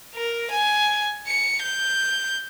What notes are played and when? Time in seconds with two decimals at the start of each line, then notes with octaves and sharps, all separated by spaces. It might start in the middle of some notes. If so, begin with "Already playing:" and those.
0.15 A#4
0.51 G#5
1.27 C#7
1.62 G6